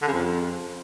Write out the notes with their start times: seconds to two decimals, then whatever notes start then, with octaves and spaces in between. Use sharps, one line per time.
0.02 D3
0.08 C#3
0.13 F2